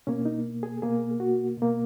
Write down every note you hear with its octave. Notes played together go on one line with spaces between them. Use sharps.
B2 A#3 C#4
D#4
G#4
B2 A#3 G#4
F#4
B2 A#3